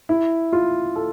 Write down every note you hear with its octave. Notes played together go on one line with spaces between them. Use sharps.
E4
F4
A4